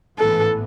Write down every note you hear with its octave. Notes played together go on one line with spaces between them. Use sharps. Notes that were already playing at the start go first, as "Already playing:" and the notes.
A1 G#2 E3 B3 A4